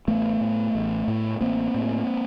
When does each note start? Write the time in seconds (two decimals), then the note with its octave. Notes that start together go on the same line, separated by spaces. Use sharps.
0.08 A1 A3 B3
0.41 A2
0.75 A1
1.08 A2
1.41 A1 A#3 C4
1.74 A2